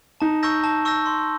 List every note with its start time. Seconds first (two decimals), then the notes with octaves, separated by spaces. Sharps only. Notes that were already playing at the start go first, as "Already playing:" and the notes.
0.21 D#4 A5
0.43 C#6 E6 G6 A#6
0.64 A5
0.85 C#6 E6 G6 A#6
1.06 C6